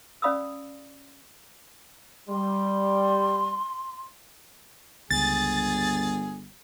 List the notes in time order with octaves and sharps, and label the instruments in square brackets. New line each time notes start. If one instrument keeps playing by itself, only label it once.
[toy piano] C#4 D5 F5 B5 D#6 E6
[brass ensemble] G3 [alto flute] C6
[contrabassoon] G1 [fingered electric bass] C#2 [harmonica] G#4 [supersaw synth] A6